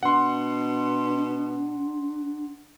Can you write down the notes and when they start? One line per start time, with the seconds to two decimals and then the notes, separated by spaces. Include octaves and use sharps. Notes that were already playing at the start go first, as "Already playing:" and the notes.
0.03 B2 D4 F#5 C6